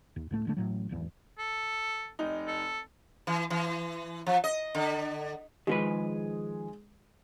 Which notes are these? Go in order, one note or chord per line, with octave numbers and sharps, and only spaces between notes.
D#2
C#2 A2 A3
D#1 D3 A3
A1 A2 F#3
D1 G#1 E2
A4
F1 D#4
A4
E3
E3
F3
D#5
D3
D#3 F3 G#3 G#4 B4